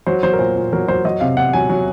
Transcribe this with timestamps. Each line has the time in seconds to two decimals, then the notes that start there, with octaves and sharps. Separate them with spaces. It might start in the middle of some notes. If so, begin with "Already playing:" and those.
0.07 F#3 C5
0.23 F#3 C5
0.33 A#4
0.39 A#2 C5
0.56 A#2
0.73 F#3 A#4
0.88 F#3 C5
1.05 F#3 D#5
1.21 C3 F5
1.37 C3 F#5
1.53 F#3 G#5
1.69 F#3